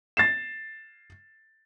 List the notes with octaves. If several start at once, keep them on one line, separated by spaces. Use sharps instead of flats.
A6 C7 E7